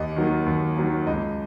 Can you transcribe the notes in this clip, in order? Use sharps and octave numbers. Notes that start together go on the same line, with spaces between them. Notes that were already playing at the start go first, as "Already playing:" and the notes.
Already playing: D#2 D#5
D#3 F#3 A#3
D#2
D#3 F#3 A#3
C#2 D#5